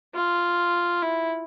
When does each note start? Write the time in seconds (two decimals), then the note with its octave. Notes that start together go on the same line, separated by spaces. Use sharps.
0.15 F4
1.02 E4